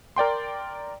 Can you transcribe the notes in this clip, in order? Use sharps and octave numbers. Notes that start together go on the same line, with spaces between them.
A#4 D5 G5 C6